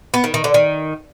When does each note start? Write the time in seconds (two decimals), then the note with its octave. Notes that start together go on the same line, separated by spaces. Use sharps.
0.14 B3
0.24 D#3
0.34 D#3
0.44 D3
0.54 D#3